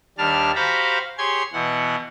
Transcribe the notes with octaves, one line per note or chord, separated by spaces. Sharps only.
D#2 G3 D4 A5 F6
F#4 G4 C5 F5 A#5 B5
G4 G#4 C#5 C6 G#6
B2 E3 F#5